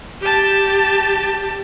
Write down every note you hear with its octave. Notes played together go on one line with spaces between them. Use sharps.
G4 A5